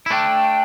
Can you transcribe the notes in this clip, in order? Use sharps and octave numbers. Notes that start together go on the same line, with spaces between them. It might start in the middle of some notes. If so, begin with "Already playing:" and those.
E4
A3 D4 G5